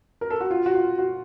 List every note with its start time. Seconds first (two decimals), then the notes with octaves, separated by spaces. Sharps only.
0.21 A#4
0.30 A4
0.40 F#4
0.51 F4
0.66 F#4
0.75 F4
0.98 F#4